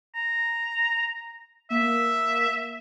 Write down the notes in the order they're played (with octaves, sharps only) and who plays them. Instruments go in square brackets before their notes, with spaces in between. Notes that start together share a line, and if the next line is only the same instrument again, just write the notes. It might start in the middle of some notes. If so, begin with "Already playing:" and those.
[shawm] A#5
[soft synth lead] A#3 [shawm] E5